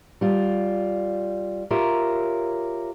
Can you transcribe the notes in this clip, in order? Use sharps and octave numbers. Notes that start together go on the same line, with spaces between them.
G3 F4
F4 G4 A#4 C#5 E5